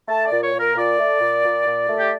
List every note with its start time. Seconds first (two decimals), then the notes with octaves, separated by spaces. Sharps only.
0.08 A3 A5
0.25 D5
0.31 A#2
0.42 C#5
0.54 A#2
0.59 A#4
0.76 A#2 D5
0.98 A3
1.21 A#2
1.44 A#2
1.66 A#2
1.89 A3
1.99 G4